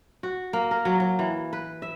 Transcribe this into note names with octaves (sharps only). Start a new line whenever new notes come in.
F#4
A#3
A#4
F#3
F#3
E3
B4
E5